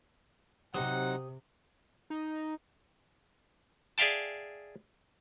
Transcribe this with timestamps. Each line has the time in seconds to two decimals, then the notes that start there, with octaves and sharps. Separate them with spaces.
0.74 C3 F#3 C4 D#4 G4 C5 F#5 D#6
2.10 D#4
3.98 G#4 D5 E5 F5 G5 A5